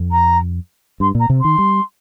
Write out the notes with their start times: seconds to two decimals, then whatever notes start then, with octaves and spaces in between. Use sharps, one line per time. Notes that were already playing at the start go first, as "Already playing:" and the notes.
Already playing: F2
0.11 A#5
1.00 G2 C6
1.15 A#2 A#5
1.30 C3
1.40 D#3 C6
1.58 G3